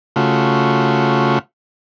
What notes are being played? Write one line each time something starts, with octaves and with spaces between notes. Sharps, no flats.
C#3 A3 F4 F#4